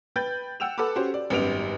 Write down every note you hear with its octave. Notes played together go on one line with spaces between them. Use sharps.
B4 G5 B5 G6 A6
F#5 G5 E6 E7 F7
A4 B4 F#5 B5 D6
C#4 F#4 G4 C5
D5
G#1 F#2 G3 B3 D7 F7